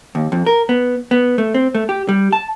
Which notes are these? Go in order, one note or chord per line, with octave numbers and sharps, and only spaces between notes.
D#2
F2
A#4
B3
B3
A3
C4
A3
G4
G3
A5